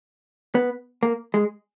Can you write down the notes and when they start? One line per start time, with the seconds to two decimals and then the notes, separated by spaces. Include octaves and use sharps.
0.55 B3
1.03 A#3
1.34 G#3